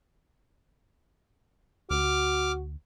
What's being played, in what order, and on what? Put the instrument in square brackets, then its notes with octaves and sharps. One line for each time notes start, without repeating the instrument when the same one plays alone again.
[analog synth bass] D2 [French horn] F#4 [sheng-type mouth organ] D6 F6